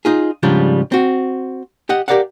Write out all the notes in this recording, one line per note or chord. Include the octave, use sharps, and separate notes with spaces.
D#4 F4 G#4
G#2 C#3 F3 G3 D4
C4 F#4
G4 D#5 F#5
G4 G#4 A#4 D5 F5 F#5